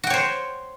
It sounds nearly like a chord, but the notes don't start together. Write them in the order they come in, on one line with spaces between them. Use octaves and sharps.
F#4 G5 C#5 C5